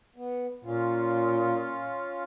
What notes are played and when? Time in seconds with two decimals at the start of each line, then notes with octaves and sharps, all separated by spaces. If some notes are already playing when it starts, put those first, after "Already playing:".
0.16 B3
0.64 A#2 C#4 F4